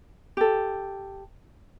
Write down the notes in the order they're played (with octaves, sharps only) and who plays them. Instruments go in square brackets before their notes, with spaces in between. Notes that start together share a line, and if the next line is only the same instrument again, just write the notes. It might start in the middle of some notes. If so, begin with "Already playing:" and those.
[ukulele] G4 A4